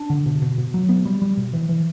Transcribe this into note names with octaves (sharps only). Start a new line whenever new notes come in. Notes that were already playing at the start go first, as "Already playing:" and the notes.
Already playing: D4
D3
B2
B2
B2
F#3
B3
G3
G3
B2
E3
E3